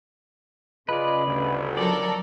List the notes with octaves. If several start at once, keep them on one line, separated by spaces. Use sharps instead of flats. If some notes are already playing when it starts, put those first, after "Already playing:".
C#3 F4 G#4 B4 D5 D#5
G1 D2
F#3 A4 A#4 D5